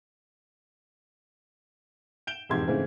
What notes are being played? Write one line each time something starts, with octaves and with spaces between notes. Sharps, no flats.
G6 D7 E7 G7
E1 F2 G#2 G4 C6 G#6
G#2 C#3 E3 A3 C4